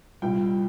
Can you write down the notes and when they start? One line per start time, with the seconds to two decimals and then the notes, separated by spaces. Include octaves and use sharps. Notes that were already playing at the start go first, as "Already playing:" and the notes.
0.22 C2 A#2 G3 G5